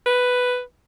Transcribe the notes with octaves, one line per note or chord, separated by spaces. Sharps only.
B4